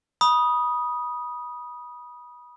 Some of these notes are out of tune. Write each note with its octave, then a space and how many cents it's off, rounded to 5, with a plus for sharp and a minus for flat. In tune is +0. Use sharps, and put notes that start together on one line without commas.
B5 -30 D#6 +0